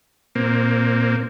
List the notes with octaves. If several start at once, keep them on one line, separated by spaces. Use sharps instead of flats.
A#2 A#3 C4